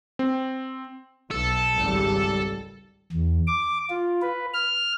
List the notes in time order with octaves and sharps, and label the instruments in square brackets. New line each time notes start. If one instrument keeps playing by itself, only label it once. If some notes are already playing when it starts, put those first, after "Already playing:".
[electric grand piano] C4
[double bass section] B1 [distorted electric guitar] A4
[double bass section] G#1 C#2 G3
[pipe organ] E2
D6
F4
B4
F6